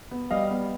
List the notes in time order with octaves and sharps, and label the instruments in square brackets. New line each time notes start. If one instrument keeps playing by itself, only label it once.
[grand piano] B3
G3 D#5 F5
B3